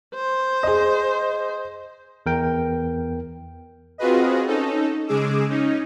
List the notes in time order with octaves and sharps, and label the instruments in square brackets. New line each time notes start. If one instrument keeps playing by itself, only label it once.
[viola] C5
[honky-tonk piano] G#4 D#5
[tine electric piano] E2 A#4 G5
[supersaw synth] C4 F4 F#4 G#4 B4 D#5
C#4 D#4 A4
C#3 G#3 G#4 D6 E6
C#4 D#4